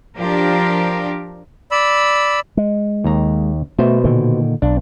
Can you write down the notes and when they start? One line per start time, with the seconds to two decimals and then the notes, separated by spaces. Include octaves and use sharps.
0.18 F3 D4 F4 G4 A#4
1.71 D5 B5 E6
2.57 G#3
3.04 D#2 A#5
3.79 B2 A3 C5
4.04 A#2 D3 D#3
4.62 B1 D4